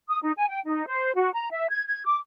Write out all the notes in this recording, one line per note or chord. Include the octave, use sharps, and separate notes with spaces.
D#6
D#4
G#5
G5
D#4
C5
F#4
A#5
E5
G#6
G#6
D6